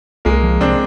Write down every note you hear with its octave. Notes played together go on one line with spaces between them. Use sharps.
C2 G#3 A#3
F3
C2 C4 D4